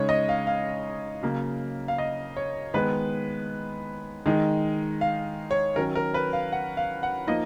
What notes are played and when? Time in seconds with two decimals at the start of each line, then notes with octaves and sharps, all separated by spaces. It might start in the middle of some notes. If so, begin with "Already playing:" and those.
Already playing: C#3 G#3 D#4 C#5
0.09 D#5
0.29 F5
0.47 F5
1.22 C#3 F#3 A#3
1.88 F5
1.98 D#5
2.37 C#5
2.74 D#3 G#3 B3 B4
4.26 D#3 G#3 D#4
5.01 F5
5.51 C#5
5.76 D#3 F#3 C#4 A#4
5.95 A#4
6.14 B4
6.33 F5
6.52 F#5
6.77 F5
7.03 F#5
7.27 F3 A#3 D#4 D#5